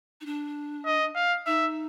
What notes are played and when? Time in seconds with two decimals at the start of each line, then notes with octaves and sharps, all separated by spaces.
0.21 D#4
0.26 D4
0.86 D#5
1.15 F5
1.46 D#4 E5